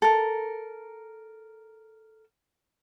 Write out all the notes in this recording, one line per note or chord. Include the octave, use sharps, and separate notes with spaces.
A4 A#4